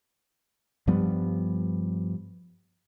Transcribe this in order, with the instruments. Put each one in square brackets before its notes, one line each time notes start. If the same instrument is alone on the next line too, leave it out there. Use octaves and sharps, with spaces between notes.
[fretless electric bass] G2 F3 G3 B3